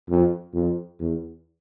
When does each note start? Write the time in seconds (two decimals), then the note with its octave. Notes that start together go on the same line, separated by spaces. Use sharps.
0.09 F2
0.54 F2
1.00 E2